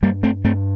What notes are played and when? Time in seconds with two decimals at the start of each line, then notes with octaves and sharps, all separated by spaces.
0.02 G2 G3 A#3
0.23 A3 C4
0.44 G2 A3 C4